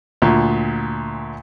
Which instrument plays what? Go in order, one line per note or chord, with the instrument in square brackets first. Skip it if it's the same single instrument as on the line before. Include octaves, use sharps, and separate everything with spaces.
[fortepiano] D2 A#2